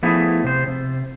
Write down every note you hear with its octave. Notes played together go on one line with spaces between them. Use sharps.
F3 A3 B3 E4 G#4
C3 C5
C3